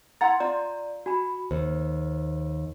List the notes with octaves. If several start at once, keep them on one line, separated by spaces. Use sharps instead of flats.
E4 F#5 A#5 C6 A6
F4 D5 A#5
F#4 G#5 B5
D#2 C5